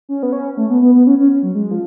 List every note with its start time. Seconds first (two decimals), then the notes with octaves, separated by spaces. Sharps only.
0.09 C#4
0.23 B3
0.32 C#4
0.57 A3
0.70 B3
0.82 B3
0.94 B3
1.07 C#4
1.19 C#4
1.43 F#3
1.55 G#3
1.71 F3